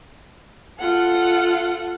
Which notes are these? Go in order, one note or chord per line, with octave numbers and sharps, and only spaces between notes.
F4 A4 F#5